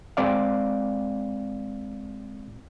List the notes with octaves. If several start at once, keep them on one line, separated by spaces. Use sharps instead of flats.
G#3 C4 D5 F5